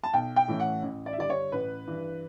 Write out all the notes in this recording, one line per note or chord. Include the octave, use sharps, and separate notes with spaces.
A5
B1 G5
G5
A2 E3 A3 C#4
F#5
A1
D5
E5
G2 D3 G3 D5
C#5
A1 B4
G2 E3